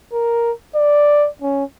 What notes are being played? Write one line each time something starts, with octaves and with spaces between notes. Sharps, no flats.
A#4
D5
C#4